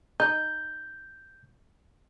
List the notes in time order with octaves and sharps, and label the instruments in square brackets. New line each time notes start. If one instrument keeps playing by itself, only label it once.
[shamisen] D#4 [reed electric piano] G6